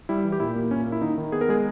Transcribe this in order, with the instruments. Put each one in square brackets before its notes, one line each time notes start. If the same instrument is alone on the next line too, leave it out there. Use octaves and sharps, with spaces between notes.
[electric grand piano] G3 E4
E3
G4
A#2 E4
A#3
A#2 C#4
A#3
E4
D#3 D#4
D#3
B3 G#4
A#4
G#3 G#4